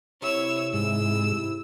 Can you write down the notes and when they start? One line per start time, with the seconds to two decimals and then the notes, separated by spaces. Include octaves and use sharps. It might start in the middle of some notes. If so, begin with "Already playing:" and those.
0.22 C3 E4 C#5 E6
0.73 G#2 E6